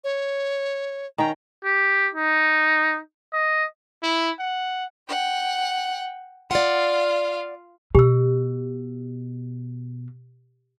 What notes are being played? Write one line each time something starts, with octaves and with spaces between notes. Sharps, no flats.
C#5
D#3 C#4 G5 A#5
G4
D#4
D#5
E4
F#5
F#5 G5
F4 D5 F5 F#5
B2 G4 E6